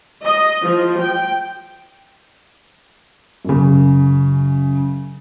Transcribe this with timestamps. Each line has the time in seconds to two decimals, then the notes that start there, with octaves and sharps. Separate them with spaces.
0.24 D#5
0.62 F3
1.00 G5
3.45 F#2 C#3